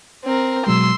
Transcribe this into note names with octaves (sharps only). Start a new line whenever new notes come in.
C4 A#4
B2 F#3 G#3 C6 E6